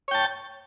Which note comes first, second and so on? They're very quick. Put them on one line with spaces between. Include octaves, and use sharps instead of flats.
C#5 G5 A5